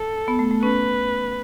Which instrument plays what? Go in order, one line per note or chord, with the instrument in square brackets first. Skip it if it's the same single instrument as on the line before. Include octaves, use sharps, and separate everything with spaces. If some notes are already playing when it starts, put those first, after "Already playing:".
Already playing: [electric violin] A4
[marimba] B3
A3
A3
[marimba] C#4 [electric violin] B4